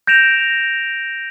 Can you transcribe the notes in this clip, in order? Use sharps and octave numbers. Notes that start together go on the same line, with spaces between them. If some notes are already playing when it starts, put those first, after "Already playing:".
G6 A#6 D7 E7 F7